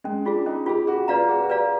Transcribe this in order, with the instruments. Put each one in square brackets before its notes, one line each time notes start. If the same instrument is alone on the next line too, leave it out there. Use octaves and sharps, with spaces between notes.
[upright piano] G#3 [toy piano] C#4
[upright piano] D4 [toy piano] F4 G#4
[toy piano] C#4 [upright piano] D#4
[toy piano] F4 G#4 [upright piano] G4
[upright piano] F#4 [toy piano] G#4
[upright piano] F4 [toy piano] B4 D5 F5 A#5
[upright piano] F#4 [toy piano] G#4
[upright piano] F#4
[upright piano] G4 [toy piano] B4 D5 F5 A#5